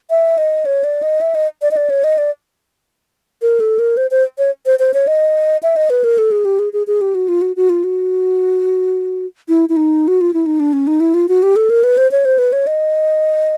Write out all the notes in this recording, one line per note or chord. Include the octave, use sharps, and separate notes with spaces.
E5
D#5
C#5
D5
D#5
E5
D#5
D5
D#5
D5
C#5
D#5
D5
A#4
A4
A#4
C5
C5
C#5
C5
C5
C#5
D#5
E5
D#5
B4
A#4
A4
G#4
G4
G#4
G#4
G#4
G4
F#4
F4
F#4
F#4
F4
F#4
E4
E4
D#4
F#4
F4
E4
D#4
D4
C#4
D#4
E4
F4
F#4
G4
A4
A#4
B4
C5
C#5
C5
B4
C#5
D#5